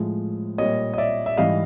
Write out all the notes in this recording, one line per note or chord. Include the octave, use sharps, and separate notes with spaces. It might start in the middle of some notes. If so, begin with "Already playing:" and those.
Already playing: A2 F3 G#3
A#2 G3 C#5 D#5
D#5
D5 E5
E5
G#2 E3 G3 D#5 F5